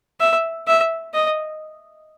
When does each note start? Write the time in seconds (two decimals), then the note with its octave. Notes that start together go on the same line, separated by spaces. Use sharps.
0.20 E5
0.67 E5
1.14 D#5